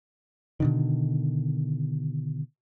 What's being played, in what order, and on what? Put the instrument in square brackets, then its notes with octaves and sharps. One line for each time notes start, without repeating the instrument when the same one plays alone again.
[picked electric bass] B2 D3 D#3